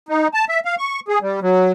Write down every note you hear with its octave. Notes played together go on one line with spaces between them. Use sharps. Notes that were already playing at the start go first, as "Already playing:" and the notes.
D#4
A5
E5
F5
C#6
G#4
G3
F#3